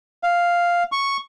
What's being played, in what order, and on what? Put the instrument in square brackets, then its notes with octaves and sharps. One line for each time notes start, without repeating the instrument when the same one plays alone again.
[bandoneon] F5
C#6